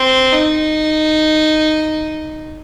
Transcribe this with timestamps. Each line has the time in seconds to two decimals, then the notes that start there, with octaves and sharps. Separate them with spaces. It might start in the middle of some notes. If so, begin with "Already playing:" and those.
Already playing: C4
0.33 D#4